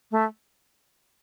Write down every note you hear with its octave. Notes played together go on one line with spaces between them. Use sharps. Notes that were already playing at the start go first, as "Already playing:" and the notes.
A3